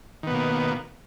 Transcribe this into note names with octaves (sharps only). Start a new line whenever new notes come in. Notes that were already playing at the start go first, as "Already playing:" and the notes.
B2 D#3 A#3 B3